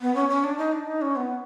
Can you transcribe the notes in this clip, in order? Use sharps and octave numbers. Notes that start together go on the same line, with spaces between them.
B3
C#4
C#4
D4
D#4
D4
D#4
C#4
B3